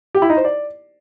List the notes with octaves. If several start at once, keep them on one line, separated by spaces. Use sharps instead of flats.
G4
E4
D#4
C5
D5